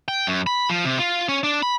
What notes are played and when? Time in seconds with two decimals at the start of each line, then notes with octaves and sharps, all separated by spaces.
0.08 G5
0.27 F#2
0.47 B5
0.69 F3
0.85 C3
0.99 F4
1.29 C#4
1.43 D4
1.63 B5